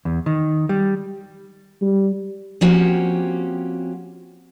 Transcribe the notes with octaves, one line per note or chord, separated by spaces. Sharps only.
E2
D#3
G3
G3
F3 A#3 C4 C#4 F#4 G4